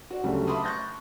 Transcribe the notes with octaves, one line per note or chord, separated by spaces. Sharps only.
F#4 D5 F#5
D2 C#3 F#3 G3 A3
E5 A5 B5 C6 D6 D#6
C#6 F#6 G6 A6 A#6